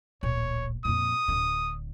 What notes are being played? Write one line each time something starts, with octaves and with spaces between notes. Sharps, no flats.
D1 A#1 C#5
F2 A#2 D#6
D1 D3